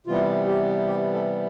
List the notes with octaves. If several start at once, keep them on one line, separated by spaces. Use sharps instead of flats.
C3 E3 G3 B3 F4
G4
G4
A4